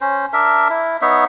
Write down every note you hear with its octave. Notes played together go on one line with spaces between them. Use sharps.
C#4 C5
D4 A#4 E5
E4
B3 D#4 C#5 E5